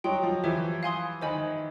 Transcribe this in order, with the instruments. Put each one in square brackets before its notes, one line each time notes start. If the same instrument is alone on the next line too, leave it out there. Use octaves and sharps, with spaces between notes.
[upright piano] F#3 [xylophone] D#5 G5 C6 D#6
[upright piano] F3
[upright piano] E3 [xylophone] G4 C5 E5 G#5
[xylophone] F5 G#5 C6 D#6
[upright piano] D#3 [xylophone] C5 D#5 G#5 B5